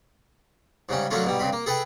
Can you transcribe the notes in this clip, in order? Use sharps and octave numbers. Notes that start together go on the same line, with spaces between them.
G#2 C#3 G3 C#4
F#2 D3 F#3 A3 C#4 F4
G#2 B2 G3
G2 C#3 C4 B5
A#3
G#4 A4 B4 G5